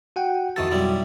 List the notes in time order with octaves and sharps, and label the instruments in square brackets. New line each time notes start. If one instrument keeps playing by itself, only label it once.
[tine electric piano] F#4 F#5 G5
[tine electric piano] F2 F#4 A6 [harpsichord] D#3 E3 A4
[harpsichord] B1 G3 E4